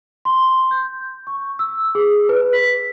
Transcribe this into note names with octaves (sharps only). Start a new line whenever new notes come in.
C6
G6
C#6
E6
G#4
B4
B6